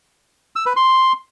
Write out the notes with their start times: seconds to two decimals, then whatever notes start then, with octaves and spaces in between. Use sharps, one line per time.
0.56 E6
0.66 B4
0.76 C6